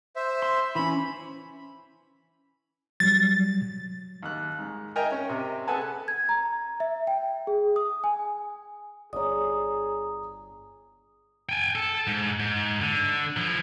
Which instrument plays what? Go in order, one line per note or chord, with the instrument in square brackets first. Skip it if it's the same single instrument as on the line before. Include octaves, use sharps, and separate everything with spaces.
[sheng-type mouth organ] C5 E5
[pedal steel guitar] C6
[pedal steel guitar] E3 C#4 [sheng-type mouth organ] B5
[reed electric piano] F#3 G3 [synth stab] A6
[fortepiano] D#2 F#6
G#2
A#4 D#5 E5 G5 G#5 A#5
C#4
C3
G#4 A4 B4 F#5 G#5 A5
[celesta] G#6
A#5
E5
G5
G#4
D#6
G#5
[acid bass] G1 [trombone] G#4 [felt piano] C#5 D5 [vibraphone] A#5 D#6
[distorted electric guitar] G5 G#5
A4
G#2
G#2
D3
F3 E4